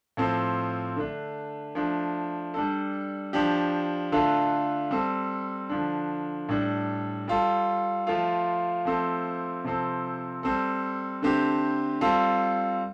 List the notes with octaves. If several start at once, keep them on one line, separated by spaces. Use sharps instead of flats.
A2 F3 C4 A4
D3 A3 D4
F3 A3 D4
G3 D4 A4
F3 D4 G4
D3 A3 D4 F4 A4
G3 C4 A4
D3 F3 D4
A2 G3 D4 A4
G3 F4 A4
F3 A3 F4
F3 A3 C4 A4
C3 F3 C4 A4
G3 C4 A4
D3 A3 C4 G4
G3 C4 F4 A4